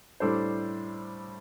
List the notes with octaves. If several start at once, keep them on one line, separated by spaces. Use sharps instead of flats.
A2 G3 D4 A4 C5